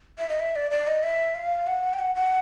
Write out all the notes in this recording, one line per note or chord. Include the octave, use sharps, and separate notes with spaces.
E5
D#5
E5
D5
D5
D#5
E5
F5
F#5
G5
F#5
F#5